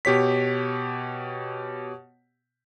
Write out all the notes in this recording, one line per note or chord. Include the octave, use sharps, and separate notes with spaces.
B2 G4 C#5 B6